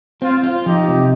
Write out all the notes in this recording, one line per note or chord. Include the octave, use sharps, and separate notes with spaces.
C4 F4
F4
F3 D#4 G4
C3